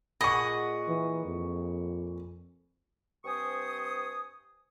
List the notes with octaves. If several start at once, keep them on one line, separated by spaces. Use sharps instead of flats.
A#2 G#4 D#5 F#5 B5 C#6
E3
F2
G2 C4 C5 G#5 C#6 D#6